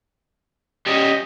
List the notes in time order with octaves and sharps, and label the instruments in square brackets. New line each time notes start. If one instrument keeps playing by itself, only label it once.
[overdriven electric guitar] G3 C#4 [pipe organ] D#5